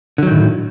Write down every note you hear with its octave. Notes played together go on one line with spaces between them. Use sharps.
A2 D3 D#3 F#3